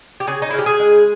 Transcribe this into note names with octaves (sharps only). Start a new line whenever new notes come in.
G4
C#3 G#4
D#4
C#3 E4
G4
G#4
G#3